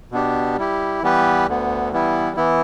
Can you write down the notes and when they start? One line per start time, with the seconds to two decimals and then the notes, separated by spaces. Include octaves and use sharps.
0.12 B2 B3 D4 G4
0.57 G3 E4 G4
1.02 E3 G3 B3 G4 B4
1.48 D2 D3 B3
1.92 E3 G3 B3 E4
2.37 E3 B3 E4